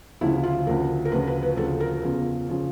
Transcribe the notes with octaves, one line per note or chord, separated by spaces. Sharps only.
D2 C#3 F3 E4
F4
D2 C#3 F3 A#4
A#4
D2 C#3 F3 B4
B4
B4
D2 C#3 F3 A4
A#4
E2 C#3 F3
C#3 F3